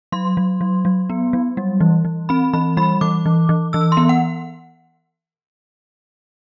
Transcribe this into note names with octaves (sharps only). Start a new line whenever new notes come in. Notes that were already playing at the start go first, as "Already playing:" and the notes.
F#3 C6
F#3
F#3
F#3
B3
F#3
G3
E3
E3
C4 B5
E3 B5
G3 B5
E3 D6
E3
E3
E3 E6
C6
B3
F#5